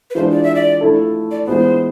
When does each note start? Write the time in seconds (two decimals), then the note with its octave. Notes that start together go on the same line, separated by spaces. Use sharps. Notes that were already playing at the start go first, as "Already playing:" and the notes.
0.10 B4
0.15 E3 G#3 D4 F4 C5
0.32 D5
0.44 E5
0.55 D5
0.81 F3 A3 E4 A4
1.31 D5
1.47 E3 G#3 B3 C5